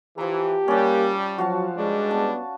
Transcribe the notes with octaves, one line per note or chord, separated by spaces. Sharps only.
E3 F3 G4 A#5
G3 A#3 C#4 D4
F3 F#3 F#4 F5 A5
G2 G3 G#3 D4
B3 A5